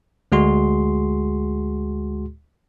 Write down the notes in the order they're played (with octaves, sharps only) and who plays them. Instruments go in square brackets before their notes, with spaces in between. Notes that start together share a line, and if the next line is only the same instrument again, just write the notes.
[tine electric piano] D2 G#3 F#4 G#4 C6